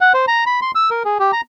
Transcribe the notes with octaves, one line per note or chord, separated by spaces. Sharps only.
F#5
C5
A#5
B5
C6
E6
A#4
G#4
G4
A#5